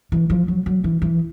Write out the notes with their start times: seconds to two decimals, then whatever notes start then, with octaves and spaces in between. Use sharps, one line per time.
0.12 E3
0.30 F3
0.48 F#3
0.66 F#3
0.84 E3
1.02 E3